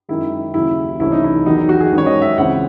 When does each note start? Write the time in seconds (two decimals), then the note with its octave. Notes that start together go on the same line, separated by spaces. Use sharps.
0.09 F#2 D#3 G#3 E4
0.54 D#2 C#3 F#3 E4
1.00 C2 C3 E3 A3 C#4 E4
1.12 D#4
1.24 E4
1.46 E2 D#3 F#3 D#4
1.58 D#4
1.69 F#4
1.80 G#4
1.92 G#2 D#3 G#3 C#4
1.98 C#5
2.06 D#5
2.22 E5
2.37 C#2 C#3 E3 C4 F#5